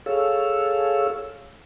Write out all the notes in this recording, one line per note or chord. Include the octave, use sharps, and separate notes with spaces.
G#4 A4 C#5 F5 E6